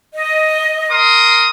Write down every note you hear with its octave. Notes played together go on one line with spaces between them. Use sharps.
D#5
A#4 C6 D#6